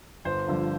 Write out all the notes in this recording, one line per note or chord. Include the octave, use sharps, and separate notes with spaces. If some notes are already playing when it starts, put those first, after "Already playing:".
G1 C5
G2 D3 F3